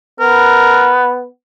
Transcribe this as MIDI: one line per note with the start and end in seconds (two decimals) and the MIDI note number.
0.20 1.26 59
0.20 0.94 70